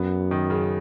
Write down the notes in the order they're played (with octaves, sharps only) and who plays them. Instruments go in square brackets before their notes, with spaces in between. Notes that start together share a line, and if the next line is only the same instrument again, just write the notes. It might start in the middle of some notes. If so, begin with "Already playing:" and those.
Already playing: [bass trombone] F#2 [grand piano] B3
[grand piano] D#3
C#3